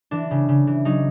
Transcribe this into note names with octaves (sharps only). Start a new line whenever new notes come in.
E3 D4
C#3
C#3
E3
F#3 D#4